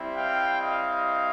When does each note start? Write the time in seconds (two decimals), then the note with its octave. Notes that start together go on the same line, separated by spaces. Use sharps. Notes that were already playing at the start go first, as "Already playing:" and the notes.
Already playing: G3 C4 E4
0.16 F5 G5
0.61 D#5 F5